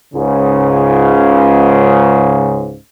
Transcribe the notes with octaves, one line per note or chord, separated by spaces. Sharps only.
C#2 G#2 C#3